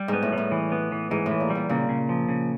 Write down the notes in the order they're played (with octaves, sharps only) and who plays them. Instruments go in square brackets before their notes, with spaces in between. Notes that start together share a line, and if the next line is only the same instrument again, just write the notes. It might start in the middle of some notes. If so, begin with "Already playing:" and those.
Already playing: [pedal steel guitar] G3
[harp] G#2 [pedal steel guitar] B3
[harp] A2
[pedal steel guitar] G3
[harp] A2
[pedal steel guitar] E3
B3
E3
[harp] G#2 [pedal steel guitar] E3
[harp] A2
[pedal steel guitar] E3
[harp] A#2
[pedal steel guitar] G3
[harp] A#2
[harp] A#2 [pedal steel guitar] C#3
[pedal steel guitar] C#3
F3
C#3